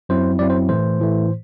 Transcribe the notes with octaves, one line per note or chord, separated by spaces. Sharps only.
F#2 F#3 C4 E4 C5
F#2 F#3 C4 E4 D5
C5
A2 E3 A3 C5
A2 E3 A3